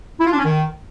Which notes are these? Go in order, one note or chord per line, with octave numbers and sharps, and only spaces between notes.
E4
F4
D4
C#4
D#3